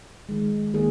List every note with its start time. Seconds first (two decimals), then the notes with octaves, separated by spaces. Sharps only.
0.29 D#3 G#3
0.74 D#3 A#3 G#4